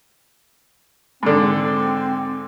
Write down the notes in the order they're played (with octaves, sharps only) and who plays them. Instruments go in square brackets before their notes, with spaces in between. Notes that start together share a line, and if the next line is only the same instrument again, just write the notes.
[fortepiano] G#2 D3 [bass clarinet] C4